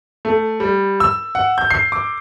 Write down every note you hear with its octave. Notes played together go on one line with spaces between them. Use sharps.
A3
G3
E6
F#5
G6
C7
D6